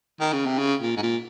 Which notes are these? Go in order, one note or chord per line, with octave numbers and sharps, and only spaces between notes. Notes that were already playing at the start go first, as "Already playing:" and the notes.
D#3
C#3
C3
C#3
A#2
G#2
A#2